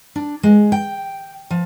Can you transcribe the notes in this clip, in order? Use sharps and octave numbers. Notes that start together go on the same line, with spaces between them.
D4
G#3
G5
F3